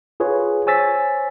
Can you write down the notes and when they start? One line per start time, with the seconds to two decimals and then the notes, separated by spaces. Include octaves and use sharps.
0.20 F4 G#4 B4 C#5
0.66 C5 C#5 G#5 E6 A6 B6